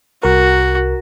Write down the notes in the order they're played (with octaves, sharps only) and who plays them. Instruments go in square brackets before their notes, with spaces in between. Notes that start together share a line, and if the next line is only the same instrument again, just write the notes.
[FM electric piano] C2 A#4 [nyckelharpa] F#4